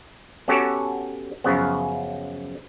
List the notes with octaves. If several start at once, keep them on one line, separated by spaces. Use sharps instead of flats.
B3 C#4 F#4 G4 A4 C#5
F#2 C#3 F3 F#3 B3